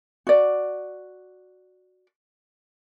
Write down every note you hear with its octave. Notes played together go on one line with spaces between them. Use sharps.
F#4 D5